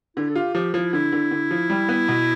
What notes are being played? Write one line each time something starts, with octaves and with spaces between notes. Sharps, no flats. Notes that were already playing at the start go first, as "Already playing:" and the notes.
D3 E4
A4
F4 G4
F3 G4
F3 E4
D3 E4
D3
D3
F3
G3
B3
B2